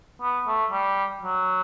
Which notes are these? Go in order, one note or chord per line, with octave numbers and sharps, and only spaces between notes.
B3
A3
G3
F#3